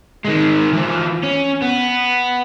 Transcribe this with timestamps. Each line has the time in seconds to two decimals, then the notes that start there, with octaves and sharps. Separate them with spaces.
0.25 D#3 G#3
0.73 E3 F3
1.23 C#4
1.62 B3